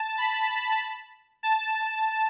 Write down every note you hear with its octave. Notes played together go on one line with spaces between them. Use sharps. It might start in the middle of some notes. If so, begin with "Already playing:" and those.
Already playing: A5
B5
A5